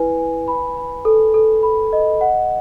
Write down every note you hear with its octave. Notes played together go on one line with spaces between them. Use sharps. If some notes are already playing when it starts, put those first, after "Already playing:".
Already playing: E4 B4 G#5
G#5
B5
B5
A4
A4
B5
D#5
F#5